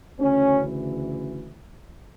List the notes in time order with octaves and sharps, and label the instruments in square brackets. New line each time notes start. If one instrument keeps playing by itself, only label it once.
[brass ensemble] D2 C#3 E3 C#4